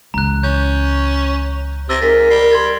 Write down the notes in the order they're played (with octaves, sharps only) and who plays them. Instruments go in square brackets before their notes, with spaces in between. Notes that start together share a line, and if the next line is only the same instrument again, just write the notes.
[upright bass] C#2 E3 [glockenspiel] A#5 F#6
[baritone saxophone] C#4 [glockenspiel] G6
[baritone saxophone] C3 [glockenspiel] E6 A6 A#6
[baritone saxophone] G#2 [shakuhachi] A#4 [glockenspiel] A6 B6
[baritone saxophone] G3 [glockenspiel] C7
[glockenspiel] C6 G#6 A6